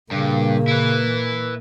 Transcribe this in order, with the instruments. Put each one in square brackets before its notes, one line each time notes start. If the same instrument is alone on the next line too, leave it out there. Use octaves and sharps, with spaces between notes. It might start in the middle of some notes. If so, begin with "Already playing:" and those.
[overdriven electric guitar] G2 [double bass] A#2 A#3 [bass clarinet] C#3
[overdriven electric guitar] E4 B4